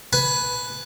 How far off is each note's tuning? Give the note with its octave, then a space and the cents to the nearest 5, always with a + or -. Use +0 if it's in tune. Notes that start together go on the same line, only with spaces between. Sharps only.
B4 +0 G#5 +25